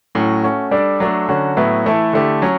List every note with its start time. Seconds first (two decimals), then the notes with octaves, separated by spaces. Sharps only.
0.15 A2 F#3 C#4
0.44 A3 C#4 F#4
0.71 G3 D4 A4 D5
1.00 F#3 A3 D4 A4
1.29 D3 F#3 C#4 F#4
1.57 A2 F#3 B3 E4
1.86 E3 A3 E4 A4
2.13 D3 A3 E4 G4
2.42 F#3 C#4